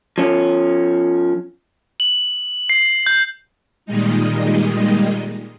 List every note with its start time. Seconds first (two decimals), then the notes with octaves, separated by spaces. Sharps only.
0.18 F3 C#4
2.00 F#7
2.70 C7
3.06 G6
3.86 A#2 D#3 G3 G#3 D#4